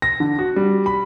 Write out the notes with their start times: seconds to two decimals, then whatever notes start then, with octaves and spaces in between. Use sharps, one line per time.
0.02 A#6
0.20 D3
0.39 F#4
0.56 G3
0.86 B5